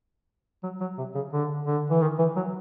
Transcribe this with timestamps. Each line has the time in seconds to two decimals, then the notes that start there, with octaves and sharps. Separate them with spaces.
0.63 F#3
0.81 F#3
0.98 C3
1.15 C#3
1.33 D3
1.67 D3
1.90 E3
2.01 D#3
2.19 E3
2.36 F#3